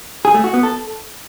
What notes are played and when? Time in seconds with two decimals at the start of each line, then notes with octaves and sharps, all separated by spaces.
0.25 G#4
0.34 A3
0.44 F#4
0.54 B3
0.63 A4